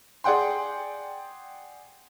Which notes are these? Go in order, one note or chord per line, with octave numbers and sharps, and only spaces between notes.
G#4 D5 F#5 G5 C6